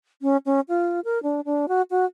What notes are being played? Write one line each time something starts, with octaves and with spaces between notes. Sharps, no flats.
C#4
C#4
F4
A#4
D4
D4
F#4
F#4